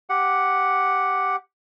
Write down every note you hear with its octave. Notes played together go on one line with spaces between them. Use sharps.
G4 F#5